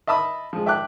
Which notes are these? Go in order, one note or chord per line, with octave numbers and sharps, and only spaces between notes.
D#5 E5 A5 B5 D#6
F3 G#3
E5 G5 A5 D6 F#6